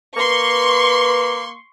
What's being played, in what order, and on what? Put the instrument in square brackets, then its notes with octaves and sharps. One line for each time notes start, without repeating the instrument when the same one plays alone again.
[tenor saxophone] A#3 [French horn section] B4 [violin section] C6 C#6